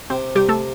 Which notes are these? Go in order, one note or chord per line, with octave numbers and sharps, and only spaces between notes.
C3 C4
C3 G3 G4
A3 A4